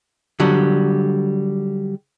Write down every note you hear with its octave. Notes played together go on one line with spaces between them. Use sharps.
D3 F#3 G3